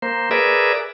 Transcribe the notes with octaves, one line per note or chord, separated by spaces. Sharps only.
A#3 C5
G#4 A#4 B4 D5 E5